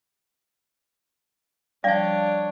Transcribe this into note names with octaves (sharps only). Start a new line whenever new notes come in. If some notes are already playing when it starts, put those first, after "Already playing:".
F3 G3 D4 C#5 D5 F5